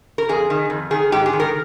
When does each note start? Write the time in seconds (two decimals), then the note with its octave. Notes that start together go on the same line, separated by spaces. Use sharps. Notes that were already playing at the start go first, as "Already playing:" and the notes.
0.18 A#4
0.29 F2 G#4
0.50 D#3
0.70 F2
0.91 D#3 G#4
1.12 G#2 G4
1.26 G#4
1.33 D#3
1.40 A#4